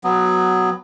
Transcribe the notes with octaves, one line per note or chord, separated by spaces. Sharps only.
F#3 B3